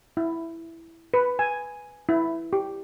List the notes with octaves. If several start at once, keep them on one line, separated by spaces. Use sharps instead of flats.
E4
B4
G#5
E4
G4